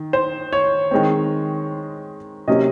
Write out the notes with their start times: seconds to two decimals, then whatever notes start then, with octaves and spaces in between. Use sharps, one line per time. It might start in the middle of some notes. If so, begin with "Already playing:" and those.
Already playing: D#3
0.13 C5
0.53 C#5
0.91 D#3 G#3 C4
2.48 C3 F#3 A#3 C#4 D#5